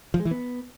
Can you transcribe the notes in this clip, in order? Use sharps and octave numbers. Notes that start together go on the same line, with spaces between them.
F3
G#3
E3
B3